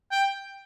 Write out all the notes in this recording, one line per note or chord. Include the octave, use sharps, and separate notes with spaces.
G5